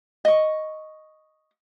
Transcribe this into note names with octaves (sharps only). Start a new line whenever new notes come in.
D#5 C#6